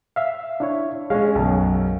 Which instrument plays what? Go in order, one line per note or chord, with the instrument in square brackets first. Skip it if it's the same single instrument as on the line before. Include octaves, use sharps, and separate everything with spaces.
[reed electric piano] E5 F5
D4 E4 C#5
[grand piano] G#3 C#4 [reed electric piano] C#5 F5
[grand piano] B1 F#2